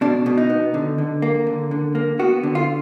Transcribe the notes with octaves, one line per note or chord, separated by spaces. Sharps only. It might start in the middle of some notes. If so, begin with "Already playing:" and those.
B2 D4
B2
D#4
B3
D3
D3
A#3
D3
D3
A#3
B3 F#4
D3
F4